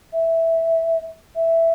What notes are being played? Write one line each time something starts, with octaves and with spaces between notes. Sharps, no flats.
E5
E5